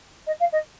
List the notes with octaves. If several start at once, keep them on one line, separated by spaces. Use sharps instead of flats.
D#5
F5
D#5